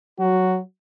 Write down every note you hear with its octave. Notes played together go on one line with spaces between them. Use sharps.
F#3 F#4